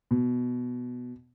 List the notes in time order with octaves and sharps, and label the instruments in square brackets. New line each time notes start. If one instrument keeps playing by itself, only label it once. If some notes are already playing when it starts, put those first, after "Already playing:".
[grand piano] B2